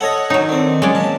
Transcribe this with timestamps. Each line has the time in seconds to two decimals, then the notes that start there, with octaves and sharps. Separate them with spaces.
0.01 A4 C#5 D#5 F#5
0.30 D#3 F#3 C#4 D#4
0.49 D3 C4
0.82 F#3 G#3 C#4 D5
0.95 A#2 A5